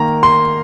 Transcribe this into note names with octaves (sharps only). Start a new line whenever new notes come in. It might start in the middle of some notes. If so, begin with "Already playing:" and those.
Already playing: D#3 A#3 A#5
C6